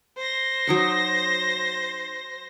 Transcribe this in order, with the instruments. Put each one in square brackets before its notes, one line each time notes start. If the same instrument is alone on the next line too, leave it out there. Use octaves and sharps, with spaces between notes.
[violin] C5 A#6
[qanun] F#3 D#4 F#5